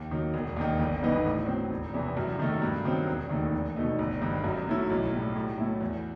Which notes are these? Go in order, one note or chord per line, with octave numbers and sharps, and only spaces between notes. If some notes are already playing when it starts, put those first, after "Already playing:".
Already playing: D#2
D#3 F#3
E1
D#2 D#3
G1
G2 E3 B3 D#4
A2
F#3 C4
E1
E2 C3 E3 B3
F#2
D#3 A3
G2
D#3 F#3 C4
E1
D#2 D#3 A3 D#4
E2
B2 A3 D#4
G1
G2 D#3
F#2
F#3 A3 E4
B1
A2 G3
A2
F#3 A3 E4
E2